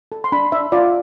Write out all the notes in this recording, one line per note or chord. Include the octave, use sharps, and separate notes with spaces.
A4
C6
D4 B5
D4 E5
F4 D5